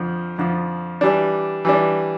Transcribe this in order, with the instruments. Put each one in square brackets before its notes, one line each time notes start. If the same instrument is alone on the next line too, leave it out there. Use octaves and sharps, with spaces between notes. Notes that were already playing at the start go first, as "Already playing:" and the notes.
Already playing: [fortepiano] F2 D3 F3
F2 D3 F3
E3 G3 D4
E3 G3 D4